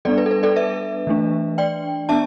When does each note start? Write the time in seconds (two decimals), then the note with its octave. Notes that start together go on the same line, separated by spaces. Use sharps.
0.05 G3 B3 D4 A4 D5
0.18 B4
0.26 A4
0.31 B4
0.43 A4 D5
0.56 B4 E5
1.07 E3 A3 D4
1.58 D5 G5
2.09 B3 D4 E5 A5